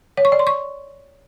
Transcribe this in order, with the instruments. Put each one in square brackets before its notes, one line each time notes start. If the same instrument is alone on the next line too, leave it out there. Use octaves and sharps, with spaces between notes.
[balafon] C#5
C#6
D5
C6
C#6